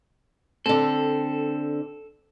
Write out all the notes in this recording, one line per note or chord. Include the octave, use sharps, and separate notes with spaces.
D3 C4 A4